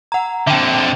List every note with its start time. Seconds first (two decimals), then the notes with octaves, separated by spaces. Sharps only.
0.12 F#5 A#5
0.47 F2 D3 E5 G5